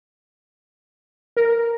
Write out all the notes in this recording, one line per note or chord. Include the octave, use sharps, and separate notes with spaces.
A#4